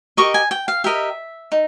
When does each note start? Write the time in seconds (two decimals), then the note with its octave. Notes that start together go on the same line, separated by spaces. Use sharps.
0.17 G4 A#4 D#5 C#6
0.34 G#5
0.51 G5
0.68 F5
0.84 G4 A#4 D#5 E5
1.52 D#4